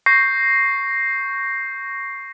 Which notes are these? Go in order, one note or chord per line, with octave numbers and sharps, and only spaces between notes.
C#6 G6 A#6 C7